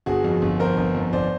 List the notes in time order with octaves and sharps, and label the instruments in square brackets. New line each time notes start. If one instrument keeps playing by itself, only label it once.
[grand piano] G1 F#4 G#4
F2
G1
F2 A#4 C5
G1
F2
G1 C5 D5